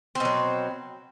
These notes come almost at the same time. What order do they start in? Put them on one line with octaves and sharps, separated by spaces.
C4 B2 F#3